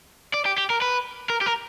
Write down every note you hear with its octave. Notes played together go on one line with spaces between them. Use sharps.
D5
G4
G4
A#4
B4
A#4
G4
A#4